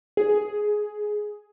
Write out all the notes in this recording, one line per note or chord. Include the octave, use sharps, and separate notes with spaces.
G#4